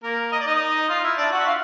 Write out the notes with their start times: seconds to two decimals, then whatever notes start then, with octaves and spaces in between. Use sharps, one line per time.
0.03 A#3 A#4
0.32 D#5
0.40 D5
0.46 D#4 D#5
0.89 F4 F5
1.03 E4 E5
1.17 D4 D5
1.32 F#4 F#5
1.40 E5
1.46 F4 F5